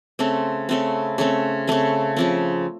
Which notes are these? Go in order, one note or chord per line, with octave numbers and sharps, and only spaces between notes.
C#3 A3 C4
C#3 A3 C4
C#3 A3 C4
C#3 A3 C4
C#3 F3 C4